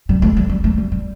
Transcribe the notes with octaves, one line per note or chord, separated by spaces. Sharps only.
G3
A3
G3
G3
A3
G3
G3